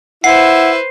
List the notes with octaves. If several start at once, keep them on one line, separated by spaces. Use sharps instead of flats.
E4 B4 C5 F#5 C7